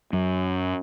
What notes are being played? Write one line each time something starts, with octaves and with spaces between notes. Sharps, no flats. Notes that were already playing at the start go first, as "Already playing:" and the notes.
F#2